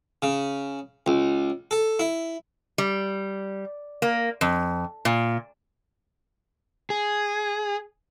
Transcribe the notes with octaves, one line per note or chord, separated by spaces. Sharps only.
C#3
C#2
A4
E4
G3
A#3
F2
A#2
G#4